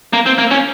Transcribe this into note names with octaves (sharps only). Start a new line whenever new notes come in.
A#3
C4
A#3
C#4